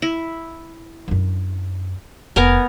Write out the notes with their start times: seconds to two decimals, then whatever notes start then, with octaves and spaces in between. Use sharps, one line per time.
0.02 E4
1.08 F#2 D4
2.36 F1 B3 A#4 G#5